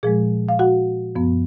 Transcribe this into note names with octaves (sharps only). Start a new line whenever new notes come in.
A#2 F3 G#3 G#4
F5
F#4 F#5
F#2 F3 B3